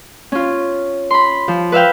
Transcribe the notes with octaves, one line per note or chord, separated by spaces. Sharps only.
C#4 F4
B5 C6
F3
B4 E5 F5 G5